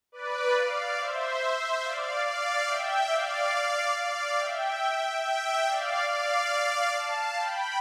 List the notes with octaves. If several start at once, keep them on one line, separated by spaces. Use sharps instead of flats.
B4 D5
D5 F5
C5 E5
D5 F5
D5 F5
E5 G5
D5 F5
D5 F5
E5 G5
E5 G5
D5 F5
D5 F5
F5 A5
G5 B5